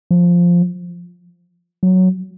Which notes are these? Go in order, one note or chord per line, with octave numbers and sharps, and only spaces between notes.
F3
F#3